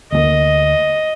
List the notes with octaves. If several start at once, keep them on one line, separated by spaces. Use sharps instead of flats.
D2 A3 A#3 D#5